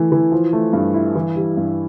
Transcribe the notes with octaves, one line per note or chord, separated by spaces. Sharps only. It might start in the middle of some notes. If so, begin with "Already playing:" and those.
Already playing: E3 A3 E4
E3
F3
A3
G2
E4
E3
G3
G2